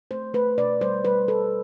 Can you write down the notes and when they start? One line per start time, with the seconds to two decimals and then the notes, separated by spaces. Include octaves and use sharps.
0.11 A3 C5
0.34 A3 B4
0.58 B2 D5
0.81 G3 C5
1.05 G3 B4
1.28 G3 A4